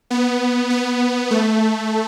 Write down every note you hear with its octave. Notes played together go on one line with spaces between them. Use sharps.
B3
B3
A3